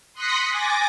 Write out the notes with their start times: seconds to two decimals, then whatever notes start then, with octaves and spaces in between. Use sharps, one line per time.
0.13 C6 D#6 F#6 A#6 B6 C#7
0.50 G#5 D6 A6 A#6